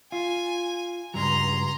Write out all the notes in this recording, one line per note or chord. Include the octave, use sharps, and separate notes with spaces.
F4 G#5
C#2 G2 F#3 A#5 C6